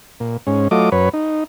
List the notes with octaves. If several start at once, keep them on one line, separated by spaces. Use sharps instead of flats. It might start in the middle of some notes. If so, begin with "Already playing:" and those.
A#2
G#2 C#4
F#3 A3 F4 D#5 D6
F#2 B4 C#5
D#4